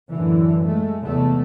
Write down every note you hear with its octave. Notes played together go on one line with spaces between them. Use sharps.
F#2 A2 D3 E3
G#3 A3
E2 A2 C3 G#3 A3